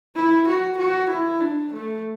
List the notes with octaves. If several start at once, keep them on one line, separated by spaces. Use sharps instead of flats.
E4
F#4
F#4
E4
D4
A3